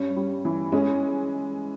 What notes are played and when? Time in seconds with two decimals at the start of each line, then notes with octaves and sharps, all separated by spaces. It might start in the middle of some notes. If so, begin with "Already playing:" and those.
Already playing: G2 C#4
0.16 G3
0.45 E3
0.72 G#3 C#4